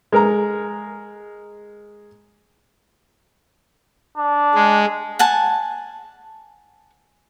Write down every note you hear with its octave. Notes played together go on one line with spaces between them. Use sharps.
G#3 A#4 A#5
D4
G#3
F#5 G#5 A5